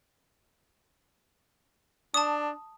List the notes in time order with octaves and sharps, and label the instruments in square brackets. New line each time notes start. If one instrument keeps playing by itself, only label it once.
[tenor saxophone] D4 [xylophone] A5 D#6